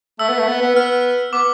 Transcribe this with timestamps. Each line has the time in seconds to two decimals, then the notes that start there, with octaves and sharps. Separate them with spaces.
0.19 A3 E6
0.29 B3
0.38 A3
0.48 B3
0.62 B3
0.76 B3 F6
1.33 B3 D6